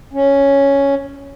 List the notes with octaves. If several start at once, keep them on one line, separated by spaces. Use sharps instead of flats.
C#4